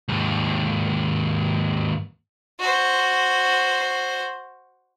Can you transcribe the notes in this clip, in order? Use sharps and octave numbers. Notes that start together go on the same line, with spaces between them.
D#2 G#2
F#4 C5